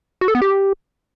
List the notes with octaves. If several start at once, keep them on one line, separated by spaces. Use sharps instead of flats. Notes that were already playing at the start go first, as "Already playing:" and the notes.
F#4
A4
B3
G4